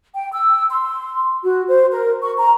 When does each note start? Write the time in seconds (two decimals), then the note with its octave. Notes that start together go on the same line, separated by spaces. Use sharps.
0.15 G5
0.33 E6
0.71 C6
1.43 F#4
1.68 C5
1.91 A#4
2.21 C#6
2.39 A#5